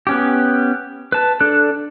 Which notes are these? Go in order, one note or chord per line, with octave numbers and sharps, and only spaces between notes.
B3 C#4 G4
B4 A5
D4 A4 F#6